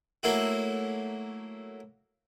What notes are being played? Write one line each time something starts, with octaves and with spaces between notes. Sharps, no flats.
F#3 A3 A#3 E4 F#4